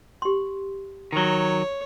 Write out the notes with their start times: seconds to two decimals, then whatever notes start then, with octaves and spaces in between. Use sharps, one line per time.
0.22 G4 C6
1.13 D#3 F#3 C#5